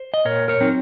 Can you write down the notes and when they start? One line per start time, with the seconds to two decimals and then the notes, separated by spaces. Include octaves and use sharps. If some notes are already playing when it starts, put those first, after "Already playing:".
Already playing: C5
0.14 D#5
0.25 A#2 A#4 C#5
0.48 A#4 C#5
0.61 F#3 C4 D#4